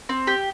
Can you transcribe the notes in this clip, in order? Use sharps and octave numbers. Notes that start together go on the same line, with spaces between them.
C4
G4